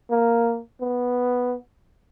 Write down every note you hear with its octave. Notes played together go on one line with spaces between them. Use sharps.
A#3
B3